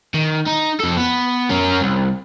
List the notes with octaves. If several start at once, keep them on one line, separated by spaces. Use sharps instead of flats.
D#3
D#4
F2 A4
B3
C#4 A#4
C2